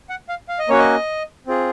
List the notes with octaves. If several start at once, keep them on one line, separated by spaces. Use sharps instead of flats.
F#5
F5
F5
D#5
A#3 C#4 F#4 C#5
D#5
C4 F4 G#4